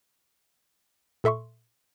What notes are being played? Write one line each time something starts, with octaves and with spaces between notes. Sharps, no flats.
A#2 A4 E5 C6 C#6